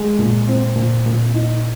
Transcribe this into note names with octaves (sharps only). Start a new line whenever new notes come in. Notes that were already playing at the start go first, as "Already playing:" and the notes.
Already playing: G#3
A#2
C4
A#2
A#2
D#4